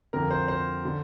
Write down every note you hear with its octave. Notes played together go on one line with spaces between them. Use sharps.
F2 D3 A#4
C5
C5
D3